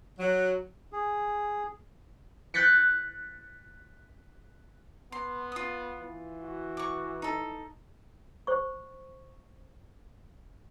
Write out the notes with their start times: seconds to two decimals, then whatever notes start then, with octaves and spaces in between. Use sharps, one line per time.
0.18 F#3
0.93 G#4
2.54 F#6 G6 A6 B6 C#7
5.12 B3 C6
5.52 F4 D#6
6.01 E3
6.42 F#4
6.77 C#6 D6
7.22 D#4 A4
8.47 C5 C#6